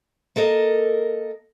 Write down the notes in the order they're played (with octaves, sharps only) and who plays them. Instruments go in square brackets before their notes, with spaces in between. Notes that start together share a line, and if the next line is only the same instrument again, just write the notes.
[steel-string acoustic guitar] A#3 A4 A#4 D#5